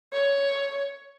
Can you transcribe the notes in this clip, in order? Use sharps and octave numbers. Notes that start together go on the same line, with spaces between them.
C#5